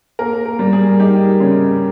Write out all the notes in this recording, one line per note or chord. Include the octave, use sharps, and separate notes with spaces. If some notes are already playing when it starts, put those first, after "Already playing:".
A#3 A#4
A#4
G3
G#4
D#4 G4
C#3